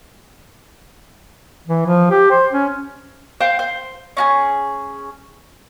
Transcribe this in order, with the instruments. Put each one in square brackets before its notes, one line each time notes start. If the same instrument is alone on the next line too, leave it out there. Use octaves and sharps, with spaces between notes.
[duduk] E3
F3
G4
C5
C#4
[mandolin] C5 F5 G5 G6
C5
C#4 F#4 G#4